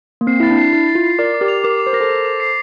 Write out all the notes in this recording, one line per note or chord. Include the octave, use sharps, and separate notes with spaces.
A#3
C4 C7
E4 A6
D4
C7
E4 A6
A6
F4
C7
A#4 D5 D6
D6
G4 A#4
F7
G4 A#4 D6
D6
C5
A#4 A#6
A4 C5
D6
D6
C7